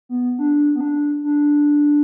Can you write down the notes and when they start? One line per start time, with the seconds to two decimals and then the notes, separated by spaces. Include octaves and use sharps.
0.09 B3
0.39 D4
0.76 B3
0.81 D4
1.24 D4